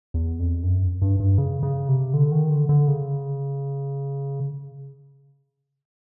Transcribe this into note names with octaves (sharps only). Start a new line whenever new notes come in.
E2
F2
F#2
G2
G2
C#3
C#3
C3
D3
D#3
D3
D3
C#3